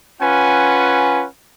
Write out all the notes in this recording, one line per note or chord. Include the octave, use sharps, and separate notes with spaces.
C#4 F4 B4 F#5 G#5